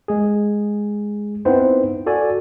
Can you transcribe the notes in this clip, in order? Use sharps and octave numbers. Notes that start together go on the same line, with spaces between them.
G#3 G#4
B3 C4 D#4 E4 B4 C5
F#4 A4 D5 G#5